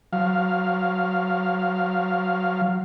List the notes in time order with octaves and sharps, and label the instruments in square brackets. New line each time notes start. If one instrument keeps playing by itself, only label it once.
[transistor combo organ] F#3 F5